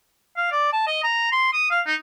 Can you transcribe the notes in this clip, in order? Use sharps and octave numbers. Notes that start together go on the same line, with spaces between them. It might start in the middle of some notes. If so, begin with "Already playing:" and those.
F5
D5
A5
D#5
A#5
C6
D#6
F5
D#4